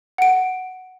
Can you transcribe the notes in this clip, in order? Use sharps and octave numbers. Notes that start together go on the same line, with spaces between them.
F#5 D7